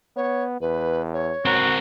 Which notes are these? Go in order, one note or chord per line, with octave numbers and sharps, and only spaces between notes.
B3 C#5
E2 B4
C#5
C4 F#4 A#4